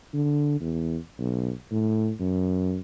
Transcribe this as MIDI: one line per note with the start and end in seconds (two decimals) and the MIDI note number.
0.13 0.58 50
0.60 0.96 40
1.18 1.51 35
1.71 2.11 45
2.20 2.79 42